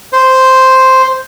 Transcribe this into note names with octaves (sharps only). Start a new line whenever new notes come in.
C5